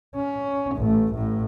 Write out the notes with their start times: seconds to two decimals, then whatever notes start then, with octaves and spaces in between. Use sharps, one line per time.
0.15 C#4
0.75 A1 A3
1.14 A1 A2